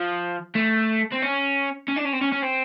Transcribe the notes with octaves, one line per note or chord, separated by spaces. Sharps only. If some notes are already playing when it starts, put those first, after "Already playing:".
Already playing: F3
A3
C4
C#4
C#4
D4
C#4
C4
C#4
C#4
C4